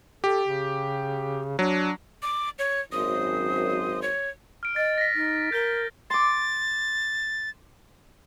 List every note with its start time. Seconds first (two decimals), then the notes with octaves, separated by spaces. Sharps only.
0.24 G4 A4
0.46 C#3
1.59 F#3 D4
2.22 D6
2.59 C#5
2.92 G#1 F#2 C5 D#6
4.02 C#5
4.63 F6 D7
4.76 D#5 A6
4.98 A#6 B6
5.15 D#4
5.52 A#4 G6 G7
6.10 C6 D6 A6